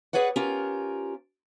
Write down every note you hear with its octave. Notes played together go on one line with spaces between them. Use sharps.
G#4 B4 C#5 D5 F#5
C#4 F4 G4 A#4